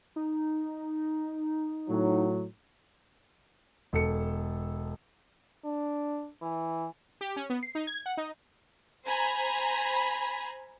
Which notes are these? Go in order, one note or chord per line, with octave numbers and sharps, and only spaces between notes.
D#4
A2 F#3
E1 A4 C#7
D4
E3
G4
C#4
B3
C7
D#4
G#6
F#5
D#4
C5 G#5 A#5 B5